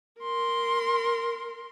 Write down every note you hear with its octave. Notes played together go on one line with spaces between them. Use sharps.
A#4 C6